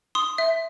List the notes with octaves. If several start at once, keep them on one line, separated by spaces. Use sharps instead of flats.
C6 D#6
E5